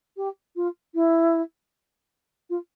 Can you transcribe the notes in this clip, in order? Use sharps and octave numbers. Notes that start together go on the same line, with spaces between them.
G4
F4
E4
F4